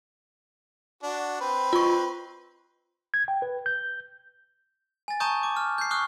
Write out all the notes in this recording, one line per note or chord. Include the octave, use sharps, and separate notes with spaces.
D4 F#4
C4 B4
F4 C#6
G#6
G5
B4
G6
G#5 A6
A5 A#5 C#6 D#6 G6
D6
F6
G6 C7
C#6 D#6 F6 F#6 C7